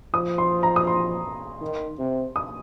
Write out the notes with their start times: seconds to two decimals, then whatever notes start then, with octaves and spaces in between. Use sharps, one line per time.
0.14 F3 D#6
0.38 C6
0.63 A#5
0.76 D#6
0.87 C6
1.61 D#3
1.99 C3
2.36 D#6